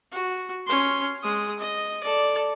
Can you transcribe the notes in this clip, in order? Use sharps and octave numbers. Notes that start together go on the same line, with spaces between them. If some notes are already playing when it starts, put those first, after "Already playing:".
F#4
C#4 C6
G#3 D#6
D#5
A4 D5